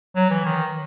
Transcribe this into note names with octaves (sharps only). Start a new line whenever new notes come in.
F#3
E3
D#3